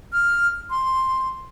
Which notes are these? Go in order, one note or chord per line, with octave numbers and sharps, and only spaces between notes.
F6
C6